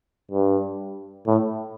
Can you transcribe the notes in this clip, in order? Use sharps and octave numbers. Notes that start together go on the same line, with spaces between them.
G2
A2